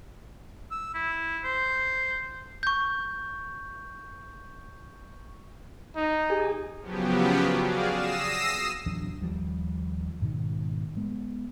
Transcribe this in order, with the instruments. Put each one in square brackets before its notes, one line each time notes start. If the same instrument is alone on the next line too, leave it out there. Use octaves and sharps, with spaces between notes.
[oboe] E6
E4
C5
[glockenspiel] C#6 G6
[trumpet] D#4
[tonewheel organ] G4 G#4 G#5
[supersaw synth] C#3 F3 F#3 B3 G4
F#4 G#4 D5 F5
D#6 E6 A#6 C7 E7
[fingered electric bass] D1 E2 F#3 D4
D#2 F3 G3
G#2 B2 D#3
G#3 B3